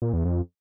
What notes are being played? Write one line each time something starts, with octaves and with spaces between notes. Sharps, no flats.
A#2
E2
F2